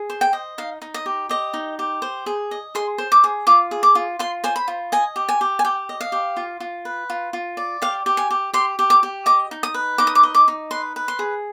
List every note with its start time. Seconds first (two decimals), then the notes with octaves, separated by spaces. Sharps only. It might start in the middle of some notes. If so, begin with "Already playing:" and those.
Already playing: G#4
0.10 C5
0.21 G5
0.33 D#5
0.58 D#4 F5
0.82 D#4
0.94 D#5
1.06 G4
1.29 G4 D#5
1.54 D#4
1.79 G4
2.02 C5
2.26 G#4
2.51 D#5
2.75 G#4 C6
2.98 C5
3.12 D6
3.24 G#4
3.47 F4 D6
3.71 G#4
3.83 D6
3.95 F4
4.19 F4 C6
4.44 C5 G#5
4.56 B5
4.68 F4
4.92 D#5 G#5
5.16 G4
5.29 G#5
5.41 G4
5.59 G#5
5.65 G4 G5
5.89 D#5
6.01 F5
6.12 G4
6.37 F4
6.60 F4
6.85 B4
7.10 F4
7.33 F4
7.57 D5
7.82 G4 F5
8.06 G4
8.17 G#5
8.30 G4
8.53 G4 C6
8.79 G4
8.90 D6
9.03 G4
9.26 D#5 D6
9.51 D#4
9.63 D#6
9.74 B4
9.98 D#4 D6
10.07 D#6
10.15 D6
10.23 D#5
10.35 D6
10.48 D#4
10.71 B4 C6
10.96 B4
11.08 C6
11.19 G#4